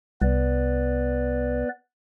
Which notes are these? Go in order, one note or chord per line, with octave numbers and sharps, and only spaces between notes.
C2 B3 B4 D5